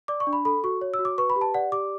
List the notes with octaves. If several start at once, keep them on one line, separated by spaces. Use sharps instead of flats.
D5 D6
C#6
D4
B5
A4 B5
F#4 C#6
C#5
E6
F#4
D6
B4 C#6
B5
G4
A5
D5 F#5
G4 D6